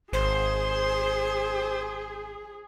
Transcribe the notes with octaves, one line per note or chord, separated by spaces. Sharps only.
G#1 G#4 C5